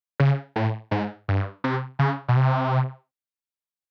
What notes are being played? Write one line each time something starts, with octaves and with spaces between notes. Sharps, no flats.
C#3
A2
G#2
G2
C3
C#3
B2
C3